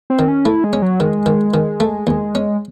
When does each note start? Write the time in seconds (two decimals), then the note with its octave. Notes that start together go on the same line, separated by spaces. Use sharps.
0.10 C4
0.19 D#3
0.28 C#4
0.45 A3 E4
0.64 G#3
0.73 C#4
0.82 F#3
1.00 D#3 G#3
1.26 D#3
1.54 D#3
1.80 A3
2.07 D#2 G#3
2.35 C#4